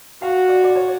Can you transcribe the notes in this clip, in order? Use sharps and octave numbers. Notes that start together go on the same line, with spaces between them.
F#4 F5
D5
D5
C#5